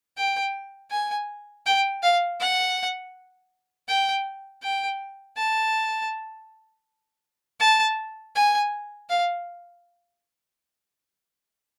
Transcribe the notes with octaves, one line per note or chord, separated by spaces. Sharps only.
G5
G#5
G5
F5
F#5
G5
G5
A5
A5
G#5
F5